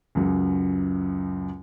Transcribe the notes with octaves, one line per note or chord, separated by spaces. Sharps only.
C#2 F#2 F#3